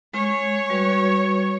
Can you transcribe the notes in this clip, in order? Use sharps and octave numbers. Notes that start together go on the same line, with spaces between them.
G#3 C#5
G3 F#4 B4